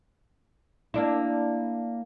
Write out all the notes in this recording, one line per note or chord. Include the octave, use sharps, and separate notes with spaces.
A#3 D4 E4